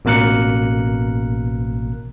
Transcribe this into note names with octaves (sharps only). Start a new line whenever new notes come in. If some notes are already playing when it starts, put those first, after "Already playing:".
A1 B2 A#3 A#4 F#6 C#7